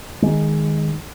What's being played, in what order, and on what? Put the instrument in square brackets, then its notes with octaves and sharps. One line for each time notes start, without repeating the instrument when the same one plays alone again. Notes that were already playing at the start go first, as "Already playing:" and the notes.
[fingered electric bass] D#3 G#3